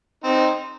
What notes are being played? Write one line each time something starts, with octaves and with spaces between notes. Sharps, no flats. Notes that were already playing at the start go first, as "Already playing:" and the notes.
C4 D#4